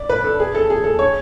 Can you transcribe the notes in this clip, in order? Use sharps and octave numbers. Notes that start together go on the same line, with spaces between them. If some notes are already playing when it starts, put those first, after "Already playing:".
Already playing: D5
B4
A4
G#4
A4
G#4
A4
C#5